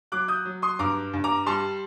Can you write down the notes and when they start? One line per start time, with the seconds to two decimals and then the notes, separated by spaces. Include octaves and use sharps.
0.12 F#3 D6 F#6
0.28 D#6 G6
0.45 F#3
0.62 C6 D#6
0.79 G2 A#5 D6
1.14 G2
1.24 A#5 D6
1.46 G3 A5 C6